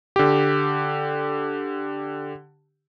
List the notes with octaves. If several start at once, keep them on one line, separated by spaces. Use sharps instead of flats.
D3 G4